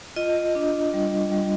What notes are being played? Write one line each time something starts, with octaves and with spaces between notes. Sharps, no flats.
F4 D#5
D4
G3
G3